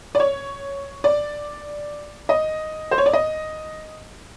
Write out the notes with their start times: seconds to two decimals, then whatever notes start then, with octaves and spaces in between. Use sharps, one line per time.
0.15 D5
0.20 C#5
1.04 D5
2.29 D#5
2.91 C5
2.98 C#5
3.06 D5
3.13 D#5